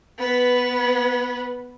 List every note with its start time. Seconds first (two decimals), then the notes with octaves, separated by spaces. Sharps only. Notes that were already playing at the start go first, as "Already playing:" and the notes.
0.18 B3 B4